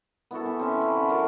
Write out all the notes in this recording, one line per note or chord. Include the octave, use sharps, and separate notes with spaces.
B3 E4 F#4 A4
E3
C4 C#4 E5
B5
D3
F#4 A#4 D5 A5